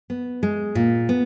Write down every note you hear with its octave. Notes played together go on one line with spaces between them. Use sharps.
B3
G#3
A#2
B3